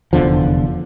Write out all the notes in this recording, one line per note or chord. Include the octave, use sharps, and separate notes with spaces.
F1 E2 D3 F3